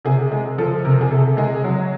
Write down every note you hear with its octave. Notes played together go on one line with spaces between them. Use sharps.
C3 G#4
G#3 G#4
F3 A4
C3 A#4
G#4
C3 A4
G#3 G#4
F#3